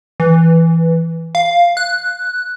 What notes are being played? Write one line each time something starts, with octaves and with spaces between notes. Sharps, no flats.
E3
F5
F#6